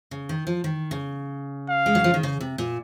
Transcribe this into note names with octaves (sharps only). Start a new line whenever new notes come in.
C#3
D#3
F3
D#3
C#3
F5
G#3
F#3
F3
D#3
C#3
C3
A#2